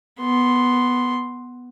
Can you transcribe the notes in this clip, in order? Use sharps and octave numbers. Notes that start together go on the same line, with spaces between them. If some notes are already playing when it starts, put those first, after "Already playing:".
B3 C6